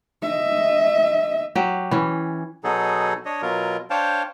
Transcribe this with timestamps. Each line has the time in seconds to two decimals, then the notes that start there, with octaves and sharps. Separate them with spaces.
0.23 D#5 E5
1.55 F#3 G4
1.91 E3 C#4
2.64 B2 F#3 D#4 G#4 A4
3.25 D4 C#5 D#5
3.42 B2 F#3 F4 A#4
3.90 D4 C5 C#5 F5 G5 A5